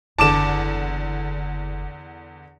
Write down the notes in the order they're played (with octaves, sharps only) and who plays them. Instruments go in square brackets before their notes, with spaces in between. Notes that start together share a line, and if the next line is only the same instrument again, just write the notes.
[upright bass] F#1 [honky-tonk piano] E2 D3 [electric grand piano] A5 D6 E7